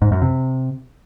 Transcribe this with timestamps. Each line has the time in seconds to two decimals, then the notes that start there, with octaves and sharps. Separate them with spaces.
0.02 G#2
0.12 F#2
0.22 C3